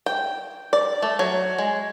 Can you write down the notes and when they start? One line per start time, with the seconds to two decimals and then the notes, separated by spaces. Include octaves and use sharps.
0.06 G5
0.73 D5
1.02 A3
1.19 F#3
1.58 G#3